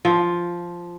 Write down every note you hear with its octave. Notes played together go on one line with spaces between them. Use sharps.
F3